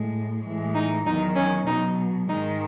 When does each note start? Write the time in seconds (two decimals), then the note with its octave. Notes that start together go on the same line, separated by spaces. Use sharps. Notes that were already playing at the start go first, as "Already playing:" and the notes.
Already playing: A2 G#3
0.45 A2 E3 G#3
0.75 D#4
1.06 E2 D#3 F#3 D#4
1.36 C#4
1.66 B2 F#3 D#4
2.28 G#2 D#3 G#3 D#4